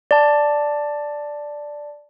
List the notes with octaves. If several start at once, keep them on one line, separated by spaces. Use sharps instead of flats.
D5 A5